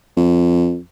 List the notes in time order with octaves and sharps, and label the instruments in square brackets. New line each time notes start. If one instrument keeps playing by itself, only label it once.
[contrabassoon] F2